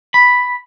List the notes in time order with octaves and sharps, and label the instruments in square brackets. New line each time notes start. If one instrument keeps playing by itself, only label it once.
[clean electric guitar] B5